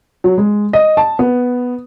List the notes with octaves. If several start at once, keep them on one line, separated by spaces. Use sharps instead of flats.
F#3
G#3
D#5
A5
B3